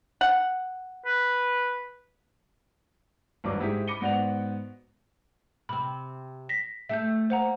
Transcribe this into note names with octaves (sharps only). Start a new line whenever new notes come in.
F#5
B4
G#1 G2 F#3 D4 B4 D6
G#2 E4 G4 G#4 B6
B5 D6 A#6 C#7 D#7 G7
G#2 B3 F#4 D5 F#5 F7
C3 C4 B5
A#6 B6
A3 G4 A4 E5 G6
A#3 C5 F#5 A#5